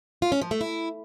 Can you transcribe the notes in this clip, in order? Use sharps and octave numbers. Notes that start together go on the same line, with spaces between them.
F4
C#4
F3
A3
E4